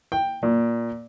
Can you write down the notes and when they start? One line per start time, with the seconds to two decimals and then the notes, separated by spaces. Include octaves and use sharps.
0.12 G5
0.43 A#2